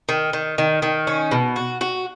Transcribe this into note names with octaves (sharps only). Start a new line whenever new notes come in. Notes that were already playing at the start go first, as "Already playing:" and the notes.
D#3
D#3
D#3
D#3
C#4
B2
F#4
F#4